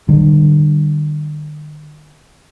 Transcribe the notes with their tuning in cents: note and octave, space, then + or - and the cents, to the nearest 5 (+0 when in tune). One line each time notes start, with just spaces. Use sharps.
D3 +45 G3 -5